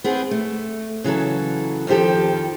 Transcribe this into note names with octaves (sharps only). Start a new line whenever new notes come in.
B3 C4 G#4
A3
C#3 E3 F#3 A4
F2 D#3 F3 G4 A4